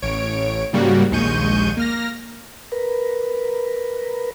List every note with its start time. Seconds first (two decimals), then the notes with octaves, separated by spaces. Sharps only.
0.02 A1 C#5 D7
0.73 G#2 C#3 G3 A#3 F#4
1.11 A#1 D#2 G#3 C#6 G6 D#7
1.77 A#3 F6 A#6
2.72 A#4 B4